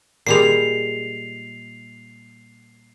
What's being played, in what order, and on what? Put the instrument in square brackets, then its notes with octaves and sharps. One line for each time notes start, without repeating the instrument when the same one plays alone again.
[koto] A#2 G3 G#3 [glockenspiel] C7 F7